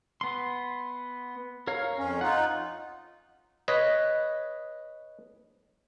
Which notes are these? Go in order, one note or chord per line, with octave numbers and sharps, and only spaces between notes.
B3 C6
A#4 C#5 F5
F2 C#4
D#4 F4 F#5
B4 C#5 D#5